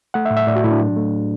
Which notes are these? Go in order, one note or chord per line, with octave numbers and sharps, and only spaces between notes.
A3 F#5
E5
A2
E5
A2 D5
F#4
A2 E4
D4
F#3
A3